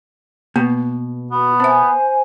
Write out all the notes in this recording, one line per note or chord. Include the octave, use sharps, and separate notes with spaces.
B2 A#3
B3 F#4
C4 C5 E5 G#5